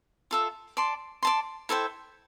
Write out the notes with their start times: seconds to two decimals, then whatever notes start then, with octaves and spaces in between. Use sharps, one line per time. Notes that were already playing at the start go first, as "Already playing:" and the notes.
0.31 F4 A4 E5
0.77 D5 A5 C6
1.23 D5 A5 C6
1.69 E4 A4 C5 G5